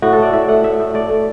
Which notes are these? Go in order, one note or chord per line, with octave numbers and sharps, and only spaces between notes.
A2 F#4
A4
A3 D5
A2 E5
A3 F#5
A2 E5
A2
A3 D5
A3